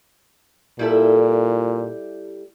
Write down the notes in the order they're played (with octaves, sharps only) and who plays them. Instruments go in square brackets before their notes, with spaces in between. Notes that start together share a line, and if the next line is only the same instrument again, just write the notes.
[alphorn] A#2 [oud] G3 E4 A4